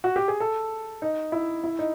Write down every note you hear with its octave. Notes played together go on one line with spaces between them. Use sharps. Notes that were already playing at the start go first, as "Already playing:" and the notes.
F#4
G4
G#4
A4
D#4
E4
E4
D#4